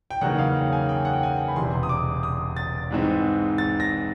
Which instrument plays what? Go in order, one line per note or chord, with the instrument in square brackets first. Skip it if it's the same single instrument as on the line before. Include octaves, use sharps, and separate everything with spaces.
[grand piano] G5
E2 C#3 F#3 A#3 D#4 F#5
F5
G5
G#5
G5
F#5
G5
G#5
B5
E1 E2 C3 C6
D#6
D6
D#6
A6
G#2 E3 G#3 C4 D#4
A6
A#6